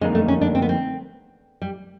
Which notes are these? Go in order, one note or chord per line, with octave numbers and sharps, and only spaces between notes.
F2 D3 G3 G#3 A#3 D#4
A3
C#4
D4
C4
B3
C4
G3